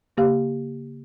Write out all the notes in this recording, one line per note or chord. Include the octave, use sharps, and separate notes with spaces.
C#3 A#3 G4 F5